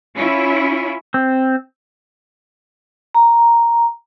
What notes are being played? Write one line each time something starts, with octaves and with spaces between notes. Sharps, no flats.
C#4 E4 F4
C4
A#5